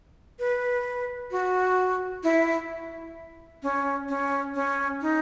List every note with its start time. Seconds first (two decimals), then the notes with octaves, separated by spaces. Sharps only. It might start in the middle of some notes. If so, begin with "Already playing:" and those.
0.39 B4
1.31 F#4
2.23 E4
3.63 C#4
4.09 C#4
4.55 C#4
5.02 D#4